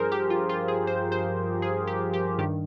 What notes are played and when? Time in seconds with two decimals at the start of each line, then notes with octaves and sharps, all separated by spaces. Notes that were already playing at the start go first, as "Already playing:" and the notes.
Already playing: G2 F3 G#4 A#4 C5
0.12 G4
0.30 F4
0.49 F4
0.68 G#4
0.87 C5
1.12 C5
1.62 G#4
1.87 G4
2.13 G4
2.39 G2 D#3 G4